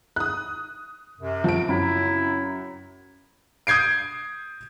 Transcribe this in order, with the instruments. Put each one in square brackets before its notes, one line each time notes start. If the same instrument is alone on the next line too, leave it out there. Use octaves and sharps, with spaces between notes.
[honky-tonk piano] D#6 F#6
[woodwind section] F#2 C3
[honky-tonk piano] F3 D7
[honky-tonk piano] F#2 [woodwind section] C#3 C4 E4
[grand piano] D#6 G6 G#6 C7 D7